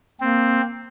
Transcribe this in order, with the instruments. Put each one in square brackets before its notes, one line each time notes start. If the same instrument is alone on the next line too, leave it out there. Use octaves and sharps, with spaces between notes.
[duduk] A#3 [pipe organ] C4